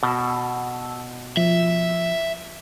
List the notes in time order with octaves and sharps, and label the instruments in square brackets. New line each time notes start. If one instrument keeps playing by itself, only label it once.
[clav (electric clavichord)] B2 [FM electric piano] A5 E6
[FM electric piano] F3 [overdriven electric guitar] E5